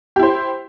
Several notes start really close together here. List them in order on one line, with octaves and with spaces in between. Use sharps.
G4 E4 C5